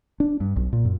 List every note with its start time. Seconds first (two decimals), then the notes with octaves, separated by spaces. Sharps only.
0.20 D4
0.40 G2
0.56 B1
0.73 A#2
0.85 F#2